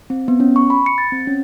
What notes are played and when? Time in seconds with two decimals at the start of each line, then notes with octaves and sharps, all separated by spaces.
0.10 C4
0.28 B3
0.40 C#4
0.56 C#6
0.70 B5
0.86 C#7
0.98 A6
1.12 C4
1.27 C#4